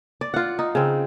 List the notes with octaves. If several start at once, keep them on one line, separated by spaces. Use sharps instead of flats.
D5
F4 F#5
D#4
C#3 C4